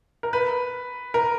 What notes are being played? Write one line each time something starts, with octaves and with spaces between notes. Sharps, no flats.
A#4
B4
A#4